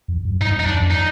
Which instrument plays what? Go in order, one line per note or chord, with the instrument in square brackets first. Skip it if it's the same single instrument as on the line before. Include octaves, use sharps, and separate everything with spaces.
[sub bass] F2
F#2
[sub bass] G2 [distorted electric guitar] D#4
[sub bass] F#2 [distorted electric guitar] D#4
[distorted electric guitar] D4
[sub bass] F2
[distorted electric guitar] D#4